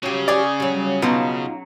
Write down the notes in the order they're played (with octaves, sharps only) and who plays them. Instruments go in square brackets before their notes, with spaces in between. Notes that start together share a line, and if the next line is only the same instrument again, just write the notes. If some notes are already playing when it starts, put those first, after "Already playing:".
[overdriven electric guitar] C#3 [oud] F#3 G4
[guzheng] C#4 G#4 [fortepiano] D5
[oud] F#3 G3
[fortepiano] B2 [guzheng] F#3 [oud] D#4 F4